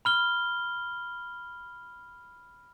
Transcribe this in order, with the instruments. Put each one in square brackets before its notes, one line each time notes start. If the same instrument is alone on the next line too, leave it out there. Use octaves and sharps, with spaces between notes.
[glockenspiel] B5 F6 G7